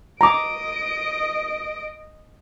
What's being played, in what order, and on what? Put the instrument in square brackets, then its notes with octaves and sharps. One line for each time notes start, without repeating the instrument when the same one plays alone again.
[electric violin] D#5 D7 [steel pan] A#5 D6